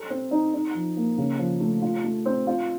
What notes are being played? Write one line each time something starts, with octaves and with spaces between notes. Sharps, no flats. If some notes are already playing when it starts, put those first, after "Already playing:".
Already playing: A4
C4
D#4
D#4
F3
A#3
C#3
F3
A3
F4
A3
C4
F4